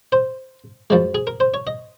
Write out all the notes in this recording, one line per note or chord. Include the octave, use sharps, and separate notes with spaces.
C5
F#2 F3 G#3
G#4
A#4
C5
C#5
D#5